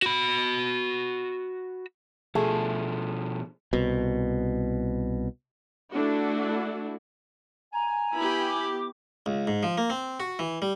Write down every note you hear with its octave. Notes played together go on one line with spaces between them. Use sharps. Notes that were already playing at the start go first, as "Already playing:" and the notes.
F#4 B5
B2 F3 A3 G#4
C2 B2
A3 D4 E4 F#4
G#5 A#5
B3 E4 G4 B5
D6
C#2
G#2
F3
A#3
C4
F#4
E3
G3